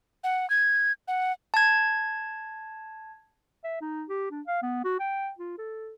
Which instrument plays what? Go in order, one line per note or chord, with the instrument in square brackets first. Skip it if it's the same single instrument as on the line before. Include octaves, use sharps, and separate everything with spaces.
[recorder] F#5
G#6
F#5
[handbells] A5 G#6
[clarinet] E5
D#4
G4
D4
F5
B3
F#4
G5
F4
A4